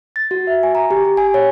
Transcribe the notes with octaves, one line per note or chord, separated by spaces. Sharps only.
A6
F#4
E5
G#5
A#5
G4
G4
G#5
C#5